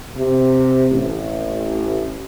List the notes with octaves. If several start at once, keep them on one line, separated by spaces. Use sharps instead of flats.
C3
A1